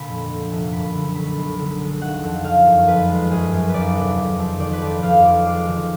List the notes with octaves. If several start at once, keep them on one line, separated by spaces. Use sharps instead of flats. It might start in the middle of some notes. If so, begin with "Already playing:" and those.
Already playing: A#2 D3 B5
F2
D3
F1
F#1 B5
D3
B1 B5
B1
D3
G#3
D#3 F#5
F2
D#3 F5
F#2
F2 B4
G#3
F#2 G#4
F#2
D#2 B4 D5
F1
D#3
F2
D#3 D5
B4
F2 D5
F2 F5
F3 D6
G#3 D6
D#3